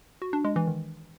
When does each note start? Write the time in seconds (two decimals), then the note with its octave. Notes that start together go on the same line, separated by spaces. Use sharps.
0.22 F#4
0.33 D4
0.45 G#3
0.56 E3
0.67 D#3